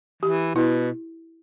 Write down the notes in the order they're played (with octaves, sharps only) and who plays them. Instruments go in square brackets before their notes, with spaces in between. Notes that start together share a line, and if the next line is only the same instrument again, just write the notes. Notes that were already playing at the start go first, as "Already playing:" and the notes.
[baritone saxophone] E3 [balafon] G4
[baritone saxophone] B2 [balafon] E4